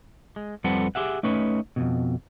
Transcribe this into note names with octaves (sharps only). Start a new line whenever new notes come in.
G#3
F2 G3 C4 A4 B4 F#5
G4 G#4 E5 F#5
A3 C#4 D#4 B4 C#5
F2 G#2 B2